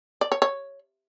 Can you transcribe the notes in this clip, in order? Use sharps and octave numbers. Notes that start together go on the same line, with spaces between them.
D5
C#5
C#5